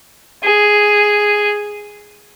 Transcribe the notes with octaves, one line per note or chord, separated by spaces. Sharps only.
G#4